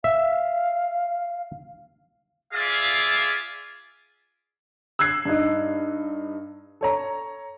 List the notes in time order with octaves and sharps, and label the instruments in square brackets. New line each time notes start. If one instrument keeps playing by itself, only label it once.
[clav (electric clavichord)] E5 [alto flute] F5
[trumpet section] F4 G#4 D5 E5 F5
[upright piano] E6 F#6 G#6 C7
G2 D#4
A4 C#5 A#5